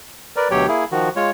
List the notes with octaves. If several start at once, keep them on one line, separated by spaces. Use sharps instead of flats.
A#4 B4 D5
D2 B2 F#3 G4 C#5 G5
A#3 E4 G#4
D#3 F3 F#4
G#3 F4 C#5